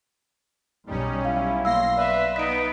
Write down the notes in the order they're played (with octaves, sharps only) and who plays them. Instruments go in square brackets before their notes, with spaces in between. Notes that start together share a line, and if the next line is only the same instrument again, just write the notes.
[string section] B1 [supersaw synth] G3 C#4 [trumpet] D#4
[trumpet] E4 [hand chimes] F5
[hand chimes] A#3 F5 E6 [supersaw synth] C6 A#6 C7
[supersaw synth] B4 [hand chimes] D5 [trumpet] E5
[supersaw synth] B3 D#4 B4 [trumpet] D#5 [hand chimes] B6 D7